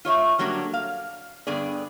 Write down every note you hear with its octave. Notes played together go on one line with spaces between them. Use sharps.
F4 C#5 D#5 E5
D3 F#3 G3 A#3 D4
F5
G2 D3 B3 G#4 D5